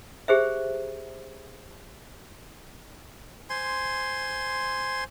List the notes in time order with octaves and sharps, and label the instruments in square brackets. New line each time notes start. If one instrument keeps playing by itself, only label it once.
[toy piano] G4 G#4 C5 E5
[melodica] C5 G#5 C6